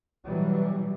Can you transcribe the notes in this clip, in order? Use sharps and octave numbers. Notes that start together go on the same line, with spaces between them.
B2 E3 F#3 G3